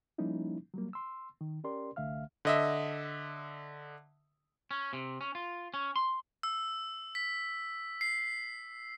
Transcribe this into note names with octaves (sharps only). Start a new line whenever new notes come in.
F3 G3 A#3 C#4 D#4 E4
F#3 G3 A#3
C6 E6
D#3
C#4 G4 A#4 D5 C6
C2 D3 A3 E5 F5 F6
D3 D#5 E5
C#4
C3
C#4
F4
C#4
C6
E6
B6
C7